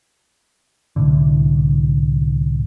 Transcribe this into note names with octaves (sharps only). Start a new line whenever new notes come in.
C2 A2 D3